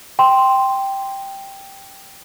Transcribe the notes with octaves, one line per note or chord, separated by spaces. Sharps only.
G5 C6